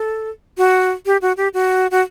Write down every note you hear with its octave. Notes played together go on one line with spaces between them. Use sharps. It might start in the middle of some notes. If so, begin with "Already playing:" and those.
Already playing: A4
F#4
G4
F#4
G4
F#4
F#4